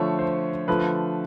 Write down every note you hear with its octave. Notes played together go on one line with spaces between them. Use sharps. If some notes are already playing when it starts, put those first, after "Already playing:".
Already playing: D3 F3 A3 C#5
C5
D3 F3 A3 B4